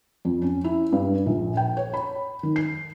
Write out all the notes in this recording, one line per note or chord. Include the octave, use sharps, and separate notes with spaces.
F2
C#4
E4
G2
A#1
G5
C#5
B5
D#3
C7